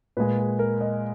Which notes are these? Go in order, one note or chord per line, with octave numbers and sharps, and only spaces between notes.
A#2 G#3 B4
G#4
A#4
D#5